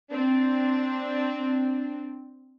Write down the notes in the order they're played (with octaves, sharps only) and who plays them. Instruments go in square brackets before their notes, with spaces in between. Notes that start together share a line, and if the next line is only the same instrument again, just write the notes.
[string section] C4 D4